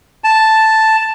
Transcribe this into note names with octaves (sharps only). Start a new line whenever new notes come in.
A5